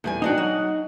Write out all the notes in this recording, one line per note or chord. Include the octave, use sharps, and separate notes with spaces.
E2 G3 G#5
C4 D4 D#4 F#4 F#5
F#3